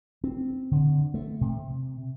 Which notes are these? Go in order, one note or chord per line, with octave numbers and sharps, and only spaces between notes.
C4
D3
A3
C3